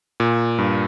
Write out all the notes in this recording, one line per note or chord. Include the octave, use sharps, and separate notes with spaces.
A#2
G2